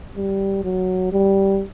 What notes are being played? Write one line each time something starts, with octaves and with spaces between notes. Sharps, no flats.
G3
F#3
G3